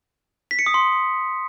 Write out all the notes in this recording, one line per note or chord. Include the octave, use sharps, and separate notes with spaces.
B6
C#7
D#6
C6